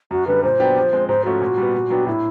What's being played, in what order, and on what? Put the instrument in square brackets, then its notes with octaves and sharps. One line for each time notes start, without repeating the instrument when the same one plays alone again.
[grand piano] F#2 [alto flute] F#4
[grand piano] D3 G3 [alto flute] B4
[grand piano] A#2 [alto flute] C5
[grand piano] F#3 B3 D4 G4
F3
G#3 C4
[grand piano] G#2 [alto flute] C5
[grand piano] F3 A3 C#4 [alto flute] F#4
[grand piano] A#2
G3 B3
A#2
F#3 B3 D4 G4
[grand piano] A2 [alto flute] E4